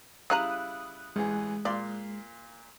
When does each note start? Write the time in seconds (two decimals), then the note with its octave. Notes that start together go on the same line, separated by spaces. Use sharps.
0.30 C#3 G3 E4 F5 A#5 D#6 F#6
1.16 A1 E3 G#3 G#4
1.65 A#2 D5 F5 C6